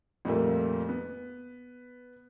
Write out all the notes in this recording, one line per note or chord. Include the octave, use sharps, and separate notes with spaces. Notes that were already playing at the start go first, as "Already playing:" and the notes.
F2 A#2 G3 A3 A#3
B3